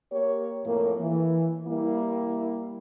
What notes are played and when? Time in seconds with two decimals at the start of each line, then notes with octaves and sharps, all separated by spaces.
0.12 A#3 G4 C#5
0.66 F2 A2 A#3
1.00 E3
1.67 G3 A#3 E4